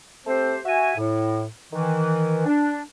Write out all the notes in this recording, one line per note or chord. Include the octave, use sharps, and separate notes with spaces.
A3 C4 G4 C5
F#4 E5 G#5
A2
D#3 E3
D4